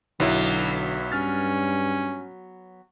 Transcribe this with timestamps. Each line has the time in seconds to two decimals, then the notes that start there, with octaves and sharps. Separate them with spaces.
0.20 B1 D3 F#3 B3 E4
1.12 G2 C#4 F6 A6